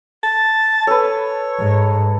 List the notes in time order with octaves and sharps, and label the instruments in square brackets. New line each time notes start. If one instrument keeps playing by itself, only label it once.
[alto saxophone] A5
[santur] A4 B4 [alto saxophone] C#5
[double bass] G#2